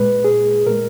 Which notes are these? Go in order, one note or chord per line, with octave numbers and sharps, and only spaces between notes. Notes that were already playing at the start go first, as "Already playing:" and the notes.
Already playing: A#2 G#3 B4
G#4
A#2 G#3 A#4